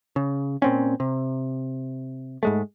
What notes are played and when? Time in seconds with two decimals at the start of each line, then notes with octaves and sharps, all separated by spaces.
0.16 C#3
0.62 A#2 C4 C#4
1.00 C3
2.43 G#2 G#3 A3